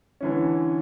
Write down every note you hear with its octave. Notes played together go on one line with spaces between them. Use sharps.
D3 E3 C#4